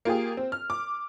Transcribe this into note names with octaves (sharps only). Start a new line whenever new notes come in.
A#3 F4 G4 G#4
C4
F6
D6